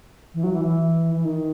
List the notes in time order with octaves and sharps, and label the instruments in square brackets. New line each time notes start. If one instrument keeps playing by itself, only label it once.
[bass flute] E3
F#3
E3
E3
E3
D#3